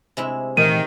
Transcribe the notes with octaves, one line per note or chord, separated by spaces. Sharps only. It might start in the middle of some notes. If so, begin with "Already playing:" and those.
C3 G#3 E4
A#2 D#3 E3 A3 D#7